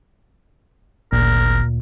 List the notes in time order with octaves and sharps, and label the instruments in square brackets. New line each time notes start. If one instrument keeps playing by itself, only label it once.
[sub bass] G#1 [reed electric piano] D2 A#2 [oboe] A#4